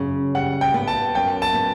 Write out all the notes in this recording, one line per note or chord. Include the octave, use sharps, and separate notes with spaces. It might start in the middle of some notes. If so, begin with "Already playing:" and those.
Already playing: F#2 C#3
G3 F#5
G5
B3
A5
F#2 G5
A5
B3